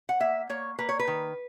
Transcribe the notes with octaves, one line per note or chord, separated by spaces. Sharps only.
F#5
A#3 E5
A#3 C#5
A#3 B4
C#5
B4
D#3